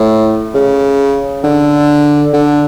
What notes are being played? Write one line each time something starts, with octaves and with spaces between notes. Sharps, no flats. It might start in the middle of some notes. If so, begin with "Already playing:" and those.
Already playing: A2
C#3
D3
D3